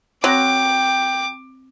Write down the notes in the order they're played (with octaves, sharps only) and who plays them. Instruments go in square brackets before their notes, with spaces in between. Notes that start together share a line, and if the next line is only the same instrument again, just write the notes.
[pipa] F#3 [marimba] C4 F#6 A#6 [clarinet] G5 [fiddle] D6